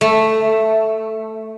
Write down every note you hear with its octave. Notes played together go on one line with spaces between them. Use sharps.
A3